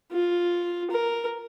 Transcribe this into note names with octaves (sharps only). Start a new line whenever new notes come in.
F4
A#4